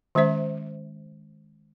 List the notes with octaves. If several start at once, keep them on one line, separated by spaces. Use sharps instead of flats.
D#3 G#3 C#4 C5 E5